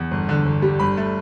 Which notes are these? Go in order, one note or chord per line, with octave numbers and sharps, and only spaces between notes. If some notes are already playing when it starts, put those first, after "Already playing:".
Already playing: E2
G1
D3
G1
G3
G1 B5
A3